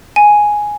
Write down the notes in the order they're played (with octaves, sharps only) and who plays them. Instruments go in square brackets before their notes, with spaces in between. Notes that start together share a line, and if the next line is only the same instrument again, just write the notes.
[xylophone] G#5